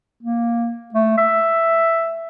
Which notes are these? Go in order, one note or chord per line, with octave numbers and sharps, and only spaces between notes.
A#3
A3
E5